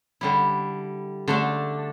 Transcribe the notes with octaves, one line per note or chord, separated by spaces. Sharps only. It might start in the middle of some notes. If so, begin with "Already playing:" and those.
D3 G3 E4
D3 A3 D4